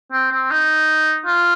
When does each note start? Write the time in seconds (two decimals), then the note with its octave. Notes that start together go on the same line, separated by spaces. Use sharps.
0.12 C4
0.31 C4
0.51 D#4
1.26 F4